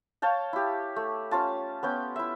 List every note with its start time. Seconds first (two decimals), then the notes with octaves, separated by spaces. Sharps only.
0.22 C#5 F5 G5 A5
0.53 E4 G4
0.96 A3
1.31 C#4 F4 A5
1.83 B3 C#4 G5
2.16 E4 E5